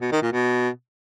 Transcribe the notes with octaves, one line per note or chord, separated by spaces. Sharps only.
B2
D#3
A#2
B2